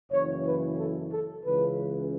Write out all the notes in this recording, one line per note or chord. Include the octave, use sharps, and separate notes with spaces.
F#1 F#2 E3 C#5
B4
A4
A4
C#2 C#3 E3 B4